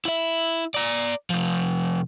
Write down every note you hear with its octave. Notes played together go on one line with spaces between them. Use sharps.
E4 E5
D5 A#5
C3 F3